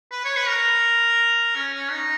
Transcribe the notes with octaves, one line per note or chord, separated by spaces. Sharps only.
B4
C#5
B4
A#4
C#4
C#4
D#4